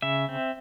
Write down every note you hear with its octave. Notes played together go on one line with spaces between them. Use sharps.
C#3 E5
C4